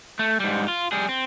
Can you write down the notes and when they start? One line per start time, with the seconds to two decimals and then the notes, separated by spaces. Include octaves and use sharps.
0.19 A3
0.40 G#2 G3
0.68 F4
0.92 G3 G#4
1.09 C4